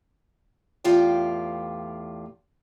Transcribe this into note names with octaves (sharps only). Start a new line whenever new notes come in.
E2 A2 F4 G4 F5 G5